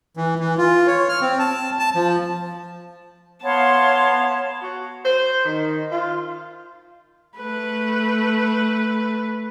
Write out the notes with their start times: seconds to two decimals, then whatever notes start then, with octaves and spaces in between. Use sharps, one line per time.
0.17 E3
0.39 E3
0.58 F4
0.87 C#5
1.09 F6
1.21 C4
1.39 A5
1.79 A5
1.95 F3
3.44 B3 C#5 F5 A5 C6
4.62 F#4
5.04 C5
5.45 D#3
5.91 F4
7.38 A3 B4